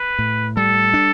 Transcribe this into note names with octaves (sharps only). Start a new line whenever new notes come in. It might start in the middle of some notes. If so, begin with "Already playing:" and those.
Already playing: B4
A2
G3 A4
D4